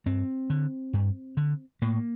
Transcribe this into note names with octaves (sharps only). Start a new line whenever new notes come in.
G2 C4
D3
G2
D3
A2 A#3